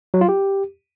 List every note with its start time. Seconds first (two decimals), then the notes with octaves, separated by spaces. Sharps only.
0.14 F#3
0.21 F4
0.29 G4